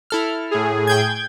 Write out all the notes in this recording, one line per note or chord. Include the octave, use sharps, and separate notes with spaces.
E4 A4 F6
A2 G#4
G5 G6 G#6